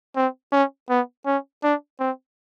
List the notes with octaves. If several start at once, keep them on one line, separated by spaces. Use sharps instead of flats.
C4
C#4
B3
C#4
D4
C4